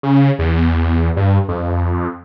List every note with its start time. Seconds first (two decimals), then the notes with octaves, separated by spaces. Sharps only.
0.03 C#3
0.39 E2
1.17 G2
1.49 F2